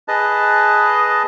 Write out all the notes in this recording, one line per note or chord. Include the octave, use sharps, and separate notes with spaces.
G#4 B4 D#5 A5